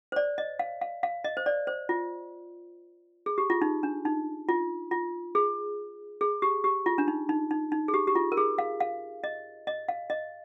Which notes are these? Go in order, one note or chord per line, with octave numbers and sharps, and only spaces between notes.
C5
D5
D#5
F5
F5
F5
D#5
C5
D5
C5
F4
G#4
G4
F4
D#4
D4
D#4
F4
F4
G#4
G#4
G4
G4
F4
D4
D#4
D#4
D#4
D#4
G#4
G4
G4
F4
A#4
G#4
F5
F5
D#5
D#5
F5
D#5